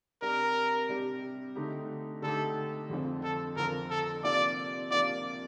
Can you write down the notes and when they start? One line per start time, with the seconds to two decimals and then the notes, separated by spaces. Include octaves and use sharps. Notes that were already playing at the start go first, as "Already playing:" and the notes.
0.22 C3 G3 D4 G4 A#4
0.88 C3 G3 D4 G4
1.55 D3 A3 D#4 G4
2.22 D3 A3 D#4 G4 A4
2.90 F2 D3 F3 C4
3.23 A4
3.56 F2 D3 F3 C4 A#4
3.90 A4
4.23 C3 F3 A#3 D4 F4 D5
4.91 C3 F3 A#3 D4 F4 D5